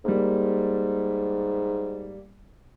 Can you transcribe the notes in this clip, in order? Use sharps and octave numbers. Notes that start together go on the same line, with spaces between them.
G#2 G3 A#3